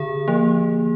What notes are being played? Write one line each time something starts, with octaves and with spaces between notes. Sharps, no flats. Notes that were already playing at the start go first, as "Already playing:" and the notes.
Already playing: D3 G#4
F3 A#3